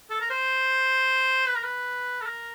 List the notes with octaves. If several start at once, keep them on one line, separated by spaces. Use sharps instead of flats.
A4
A#4
C5
B4
A#4
B4
A4
A#4